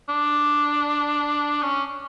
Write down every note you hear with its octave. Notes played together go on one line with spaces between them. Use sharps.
D4
C#4